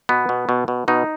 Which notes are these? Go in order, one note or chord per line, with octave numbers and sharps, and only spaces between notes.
B2 B3
B2
B2
B2
B2 D#4